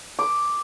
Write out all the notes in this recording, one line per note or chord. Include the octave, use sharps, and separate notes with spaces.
D6